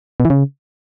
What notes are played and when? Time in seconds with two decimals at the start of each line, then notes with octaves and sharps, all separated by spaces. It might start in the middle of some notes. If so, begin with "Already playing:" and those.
0.20 B2
0.25 E3
0.30 C#3